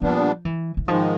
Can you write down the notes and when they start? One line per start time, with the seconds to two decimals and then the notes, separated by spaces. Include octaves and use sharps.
0.01 A#2 F3 G3 B3 D4
0.45 E3
0.77 E3
0.88 G#2 D#3 F3 G#3